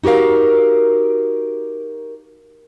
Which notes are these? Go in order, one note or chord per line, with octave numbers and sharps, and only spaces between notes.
D#4 F#4 G4 A#4 F5